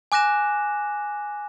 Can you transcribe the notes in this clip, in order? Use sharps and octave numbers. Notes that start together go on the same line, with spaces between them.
G#5 D6 F#6 A#6 E7